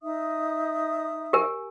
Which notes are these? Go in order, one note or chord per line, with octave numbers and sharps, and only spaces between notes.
D#4 E5 D#6
G4 A#4 G#5